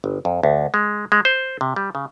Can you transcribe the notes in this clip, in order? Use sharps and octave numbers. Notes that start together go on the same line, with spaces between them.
G1
F2
D2
G#3
G#3
C5
C3
G3
C#3